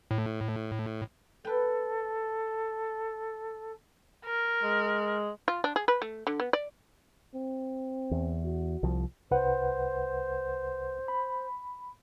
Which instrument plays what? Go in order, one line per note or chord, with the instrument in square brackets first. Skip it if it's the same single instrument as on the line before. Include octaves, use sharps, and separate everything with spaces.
[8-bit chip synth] A2
[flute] A4 [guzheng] B4 G5
[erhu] A#4
[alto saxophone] G#3
[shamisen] F4
D4
G#4
B4
A3
D3
B3
D5
[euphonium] C4
[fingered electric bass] E2
[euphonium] F#4
[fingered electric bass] C2 F3
[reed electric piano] C2 B4 F#5 [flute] C5
[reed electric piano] B5